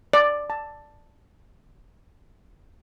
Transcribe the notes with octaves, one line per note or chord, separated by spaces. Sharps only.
D5
A5